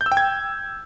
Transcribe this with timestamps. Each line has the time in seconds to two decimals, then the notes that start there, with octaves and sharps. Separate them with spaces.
0.01 G6
0.06 E6
0.12 G5
0.17 G#6